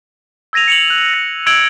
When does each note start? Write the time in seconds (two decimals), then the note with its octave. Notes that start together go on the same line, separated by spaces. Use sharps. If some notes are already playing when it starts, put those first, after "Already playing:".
0.53 E6 G#6 A#6 D#7 F7
0.68 C#7 F7 F#7
0.90 F#6
1.14 A#6
1.46 E6 F#6 G#6 D7 F7 F#7